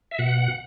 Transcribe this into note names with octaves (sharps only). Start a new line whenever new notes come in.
E5
B2 F#5